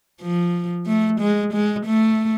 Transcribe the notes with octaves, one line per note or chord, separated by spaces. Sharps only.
F3
A3
G#3
G#3
A3